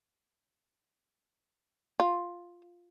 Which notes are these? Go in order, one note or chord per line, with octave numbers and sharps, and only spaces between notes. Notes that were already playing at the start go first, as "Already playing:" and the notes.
F4